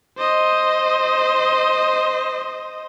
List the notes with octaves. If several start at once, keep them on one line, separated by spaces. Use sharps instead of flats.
C5 D#5